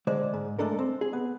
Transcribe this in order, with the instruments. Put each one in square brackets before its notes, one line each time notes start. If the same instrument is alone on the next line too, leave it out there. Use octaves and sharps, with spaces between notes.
[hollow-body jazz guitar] D3 G#3 C5 D5
G#2
G#3 A3 D4 A4 A#4
C4
G#4
B3